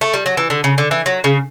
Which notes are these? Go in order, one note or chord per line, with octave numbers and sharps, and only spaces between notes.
A3
G3
F#3
E3
D3
C#3
D3
E3
F#3
C#3